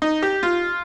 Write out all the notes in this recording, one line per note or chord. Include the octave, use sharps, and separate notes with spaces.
D#4
G4
F4